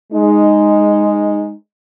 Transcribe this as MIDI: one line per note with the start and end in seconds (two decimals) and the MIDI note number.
0.13 1.54 56
0.13 1.54 63